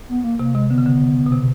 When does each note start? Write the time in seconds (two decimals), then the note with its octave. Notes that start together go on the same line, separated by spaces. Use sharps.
0.09 B3
0.24 A#3
0.39 C3 A#3
0.54 C3 G#3
0.70 D3 B3
0.78 C#3
0.86 D3
1.26 B2
1.32 C3